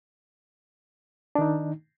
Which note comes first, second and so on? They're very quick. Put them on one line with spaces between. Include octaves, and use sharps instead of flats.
D4 D#3 D#4